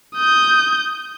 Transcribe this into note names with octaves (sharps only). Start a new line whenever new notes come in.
D#6 G6